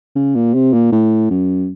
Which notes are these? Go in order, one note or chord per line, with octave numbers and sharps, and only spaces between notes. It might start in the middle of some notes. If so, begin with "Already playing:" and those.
C#3
A#2
C3
A#2
A2
F#2